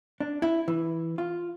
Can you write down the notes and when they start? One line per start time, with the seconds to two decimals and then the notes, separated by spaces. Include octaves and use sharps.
0.20 D4
0.42 E4
0.68 E3
1.18 F4